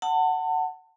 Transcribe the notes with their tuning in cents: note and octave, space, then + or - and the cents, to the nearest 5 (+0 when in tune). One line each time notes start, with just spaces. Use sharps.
F#5 +10 A5 +30